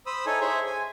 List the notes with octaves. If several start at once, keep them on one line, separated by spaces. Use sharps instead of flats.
C5 B5 D#6 E6
D#4 E4 A4 C#5 G#5
G#4 C5 C#5 E5
G#5